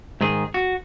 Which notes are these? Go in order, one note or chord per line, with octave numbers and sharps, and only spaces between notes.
G#2 D#3 G#4
F#4